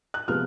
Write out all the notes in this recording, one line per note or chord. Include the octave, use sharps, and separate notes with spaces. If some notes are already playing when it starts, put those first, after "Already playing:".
F#6
C3 F3 G#3 B3 F6